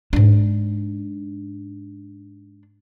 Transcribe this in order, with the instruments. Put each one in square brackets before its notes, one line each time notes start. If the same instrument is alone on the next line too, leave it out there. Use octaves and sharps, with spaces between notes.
[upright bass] G#2 D4